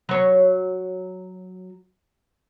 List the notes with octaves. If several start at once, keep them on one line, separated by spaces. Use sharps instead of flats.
F#3 C#5